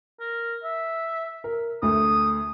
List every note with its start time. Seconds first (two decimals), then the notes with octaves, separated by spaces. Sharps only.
0.20 A#4
0.64 E5
1.44 A#4
1.82 D2 A3 D#6